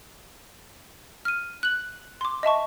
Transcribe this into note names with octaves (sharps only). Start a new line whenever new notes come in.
F6 D#7
F#6 F#7
C6 D6
D#5 E5 A5 C#6